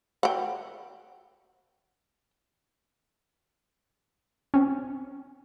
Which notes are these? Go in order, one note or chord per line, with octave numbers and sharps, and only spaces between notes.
F#5 G5
C4 C#4